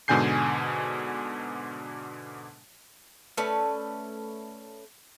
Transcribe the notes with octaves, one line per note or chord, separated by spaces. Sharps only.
G#2 B2 D3 G#5 G6 C7
A3 C#4 B4 D5